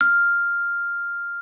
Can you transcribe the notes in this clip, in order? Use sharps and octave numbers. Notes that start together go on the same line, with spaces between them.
F6